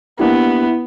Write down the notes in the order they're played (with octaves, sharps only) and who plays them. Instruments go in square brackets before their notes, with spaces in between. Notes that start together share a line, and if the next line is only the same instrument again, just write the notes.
[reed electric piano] A#3 D4 G4 [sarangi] B3 [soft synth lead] E4